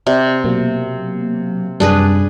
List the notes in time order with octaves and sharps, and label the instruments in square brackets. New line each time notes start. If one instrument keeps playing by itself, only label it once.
[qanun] C3 [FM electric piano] D5
[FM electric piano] B2 F#3 A#3
[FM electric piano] F#2 C3 G3 [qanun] D4 G#4 B4